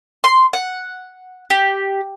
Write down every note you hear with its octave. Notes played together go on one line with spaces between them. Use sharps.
C6
F#5
G4